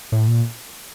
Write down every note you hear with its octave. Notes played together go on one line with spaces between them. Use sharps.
A2
A#2